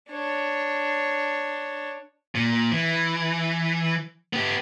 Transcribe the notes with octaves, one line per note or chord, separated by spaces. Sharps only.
D4 C#5
A#2
E3
B3 G4